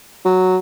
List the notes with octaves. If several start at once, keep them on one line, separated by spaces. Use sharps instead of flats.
F#3